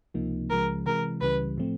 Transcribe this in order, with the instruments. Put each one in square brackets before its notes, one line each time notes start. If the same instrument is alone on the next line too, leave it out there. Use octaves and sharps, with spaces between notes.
[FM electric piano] C#2 C3 F3 A#3 D#4
[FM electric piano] C#2 C#3 F3 G#3 [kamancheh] A#4
[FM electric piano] C3 E3 G#3 [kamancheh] A#4
[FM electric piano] C#2 C#3 E3 G3 [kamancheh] B4
[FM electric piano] A2 F3 A3 C4